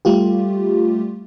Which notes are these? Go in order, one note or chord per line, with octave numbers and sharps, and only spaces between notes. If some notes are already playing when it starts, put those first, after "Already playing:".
G3 A3 F4 G4